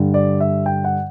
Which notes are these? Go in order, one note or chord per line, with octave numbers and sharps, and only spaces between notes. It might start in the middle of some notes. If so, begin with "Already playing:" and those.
Already playing: G2 D3 G3
D5
E5
G5
F#5